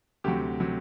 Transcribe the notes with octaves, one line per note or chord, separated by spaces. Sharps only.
D2 C3 F#3 G4
C3 F#3